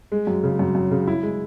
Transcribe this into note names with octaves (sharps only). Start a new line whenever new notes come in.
G#3
F#2
C#3
F#2
F#2
C#3
E4
G#3